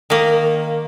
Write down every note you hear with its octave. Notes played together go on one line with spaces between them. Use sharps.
D#3 A#3